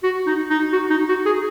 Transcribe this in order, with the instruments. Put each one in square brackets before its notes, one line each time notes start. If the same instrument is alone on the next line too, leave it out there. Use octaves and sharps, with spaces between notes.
[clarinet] F#4
D#4
D#4
F#4
D#4
F#4
G#4